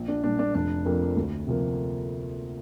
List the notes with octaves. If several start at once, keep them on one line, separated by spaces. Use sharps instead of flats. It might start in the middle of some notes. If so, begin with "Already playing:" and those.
Already playing: A#1
D4
A#2 G3 D4
D4
F1 D4
F2 F3 A#3
D2
C3 F3 A#3